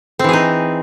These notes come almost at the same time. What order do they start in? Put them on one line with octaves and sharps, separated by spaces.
C4 E3 G#4 D#4